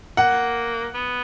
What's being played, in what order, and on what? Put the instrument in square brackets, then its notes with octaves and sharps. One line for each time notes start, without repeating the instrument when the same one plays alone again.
[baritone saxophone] A#3 [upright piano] F#5
[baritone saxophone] B3